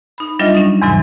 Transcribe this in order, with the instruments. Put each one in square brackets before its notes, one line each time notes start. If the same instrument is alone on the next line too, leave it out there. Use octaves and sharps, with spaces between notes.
[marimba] D#4 B5
F#3 G3 D4 F4 D#5 E5
C#4 D#4
E2 G#2 C3 E3 F#3